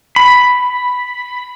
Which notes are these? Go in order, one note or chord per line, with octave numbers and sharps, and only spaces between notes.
B5